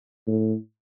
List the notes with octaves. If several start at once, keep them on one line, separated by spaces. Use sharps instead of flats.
A2